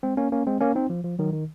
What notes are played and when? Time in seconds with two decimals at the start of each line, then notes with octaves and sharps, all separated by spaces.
0.03 G#3 C4
0.17 A#3 C#4
0.32 A#3 C#4
0.47 G#3 C4
0.61 A#3 C#4
0.75 C4 D#4
0.90 F3
1.04 F3
1.19 D#3 F#3
1.33 D#3